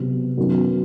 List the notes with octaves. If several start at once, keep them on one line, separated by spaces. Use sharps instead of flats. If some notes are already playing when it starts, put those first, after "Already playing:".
Already playing: C3 F#3 B3
F#2 D#3 F#3 B3 F#4